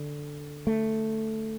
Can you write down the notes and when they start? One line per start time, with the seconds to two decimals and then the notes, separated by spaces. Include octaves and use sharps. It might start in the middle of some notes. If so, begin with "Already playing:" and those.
Already playing: D3
0.67 A3